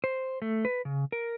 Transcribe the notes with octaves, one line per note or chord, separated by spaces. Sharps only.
C5
A3
B4
C#3
A#4